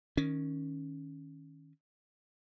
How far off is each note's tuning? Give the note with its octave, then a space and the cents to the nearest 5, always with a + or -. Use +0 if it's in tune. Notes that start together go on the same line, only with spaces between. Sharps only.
D#3 +0 C#4 +0